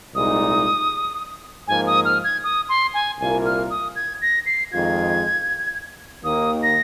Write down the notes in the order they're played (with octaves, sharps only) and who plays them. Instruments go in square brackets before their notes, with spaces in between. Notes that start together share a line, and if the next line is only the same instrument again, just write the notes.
[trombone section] C2 A#2 G#3 D#4 [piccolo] D#6
[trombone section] G#2 F3 A#3 [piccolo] G#5
[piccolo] D#6
F6
G#6
D#6
C6
G#5
[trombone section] C2 A#2 A#3 F4 [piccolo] G#5
[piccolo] F6
D#6
G#6
A#6
C7
[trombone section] F2 D#3 G#3 F4 [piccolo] G#6
[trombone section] D#2 D#3 A#3 [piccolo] D#6
[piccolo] A#6